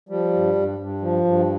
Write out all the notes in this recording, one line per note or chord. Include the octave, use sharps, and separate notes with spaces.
F3 G3
G2
G2
G2
F3
G2